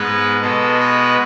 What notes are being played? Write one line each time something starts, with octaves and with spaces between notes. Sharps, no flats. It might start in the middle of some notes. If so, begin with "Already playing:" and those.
Already playing: G#2 G#3 B3 B4
B2 G#3 B3 A4
B4